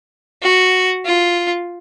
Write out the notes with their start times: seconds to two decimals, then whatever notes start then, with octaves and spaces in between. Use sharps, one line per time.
0.42 F#4
1.05 F4